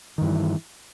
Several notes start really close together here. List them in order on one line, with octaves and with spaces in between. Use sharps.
D#3 G2 E3